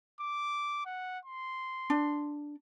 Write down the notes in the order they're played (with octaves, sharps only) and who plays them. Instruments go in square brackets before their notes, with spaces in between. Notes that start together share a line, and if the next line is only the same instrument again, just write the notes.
[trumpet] D6
F#5
C6
[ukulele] D4